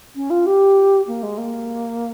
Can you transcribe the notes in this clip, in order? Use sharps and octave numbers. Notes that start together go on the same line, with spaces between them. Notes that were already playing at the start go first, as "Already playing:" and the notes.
C#4
F4
G4
A#3
G#3
A#3